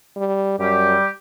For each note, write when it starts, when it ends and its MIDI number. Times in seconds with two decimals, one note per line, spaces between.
0.17 0.57 55
0.59 0.95 42
0.59 1.08 55
0.59 1.08 67